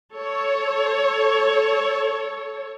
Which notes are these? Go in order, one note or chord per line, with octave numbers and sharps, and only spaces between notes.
A4 C#5